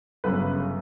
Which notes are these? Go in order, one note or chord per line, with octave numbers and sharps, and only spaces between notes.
G1 F#2 C#3 B4